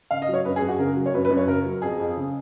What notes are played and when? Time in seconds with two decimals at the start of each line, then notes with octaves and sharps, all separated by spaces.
0.10 C#3 F5
0.22 D#5
0.28 F#3
0.34 C#5
0.45 F#2 B4
0.56 G#4
0.62 F#2
0.68 F#4
0.79 C#3 A#4
0.96 F#3
1.06 C#5
1.14 F#2 B4
1.25 B4
1.30 F#2
1.37 C#5
1.48 C#3 A#4
1.65 F#3
1.82 F2 G#4
2.00 F2
2.17 C#3